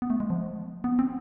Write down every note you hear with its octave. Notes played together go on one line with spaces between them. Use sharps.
B3
A3
G#3
F3
B3
C4